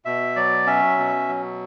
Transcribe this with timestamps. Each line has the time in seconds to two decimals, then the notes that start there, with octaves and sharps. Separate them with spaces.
0.05 B2 E5
0.36 F#3 D5
0.66 C#4 E5
0.98 B2
1.28 F#3